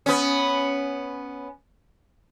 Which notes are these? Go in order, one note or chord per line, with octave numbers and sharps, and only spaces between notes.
B3 C#4